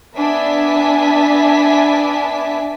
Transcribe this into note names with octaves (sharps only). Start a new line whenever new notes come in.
B3 D4 E5 G#5 A5 B6